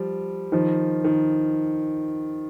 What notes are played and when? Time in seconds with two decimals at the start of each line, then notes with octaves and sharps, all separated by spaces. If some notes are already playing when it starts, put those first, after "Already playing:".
Already playing: F3 G3
0.52 D#3 F3
1.05 D#3